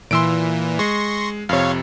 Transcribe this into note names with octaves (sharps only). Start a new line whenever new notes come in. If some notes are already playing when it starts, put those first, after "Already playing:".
A#2 E3 C6 E6 D7
G#3 C6 C#6 A#6
F2 C3 C#5 F5